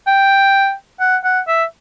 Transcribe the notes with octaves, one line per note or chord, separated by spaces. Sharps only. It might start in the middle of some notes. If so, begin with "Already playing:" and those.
G5
F#5
F#5
E5